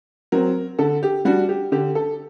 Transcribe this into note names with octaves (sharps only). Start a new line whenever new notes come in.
F#3 C4 A#4
D3 A4
G4
G3 D4 F#4
G4
D3 G4
A4